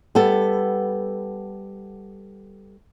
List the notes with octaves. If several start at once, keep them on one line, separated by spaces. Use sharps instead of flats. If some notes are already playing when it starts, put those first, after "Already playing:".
G3 B3 A4